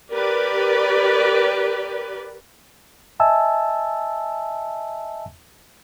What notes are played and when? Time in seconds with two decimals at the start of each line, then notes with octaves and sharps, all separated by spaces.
0.12 G4 A#4 B4 D5
3.20 D#5 E5 G#5 A5 E6